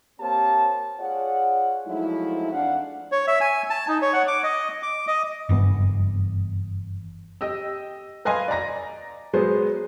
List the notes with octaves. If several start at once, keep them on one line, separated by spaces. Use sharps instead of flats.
A#3 C4 G4 C5 C#5 A5
F4 G#4 C#5 D5 F#5
F3 F#3 G#3 A3 D#4 E4
F2 D4 F5 F#5
C#5
E5
G#5
A5
D#4
C#5
F#5
D6
D#5
D6
D#5
F#1 G2 E3 B3
G4 D#5 G5 E6
B4 D#5 F5 G#5 C6
D5 D#5 A#5 A#6
F#3 G#3 B3 G#4 C5